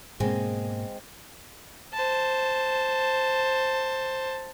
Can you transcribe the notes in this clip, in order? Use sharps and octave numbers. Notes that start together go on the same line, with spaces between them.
G#2 B2 G#3 A#3 C4
C5 A5